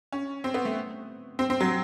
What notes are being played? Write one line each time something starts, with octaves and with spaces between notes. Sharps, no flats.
C#4
C4
B3
A3
C4
C4
F#3